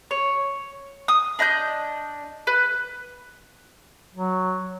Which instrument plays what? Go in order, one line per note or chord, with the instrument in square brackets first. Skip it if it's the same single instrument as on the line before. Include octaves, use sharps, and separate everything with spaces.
[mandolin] C#5
D#6
D4 D#5 D#6 G6
B4
[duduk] F#3